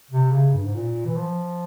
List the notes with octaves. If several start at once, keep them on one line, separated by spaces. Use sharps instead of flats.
C3
C#3
G2
G#2
A#2
E3
F3